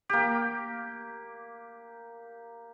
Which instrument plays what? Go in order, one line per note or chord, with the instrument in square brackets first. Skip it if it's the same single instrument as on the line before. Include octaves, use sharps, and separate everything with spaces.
[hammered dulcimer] A#3 G4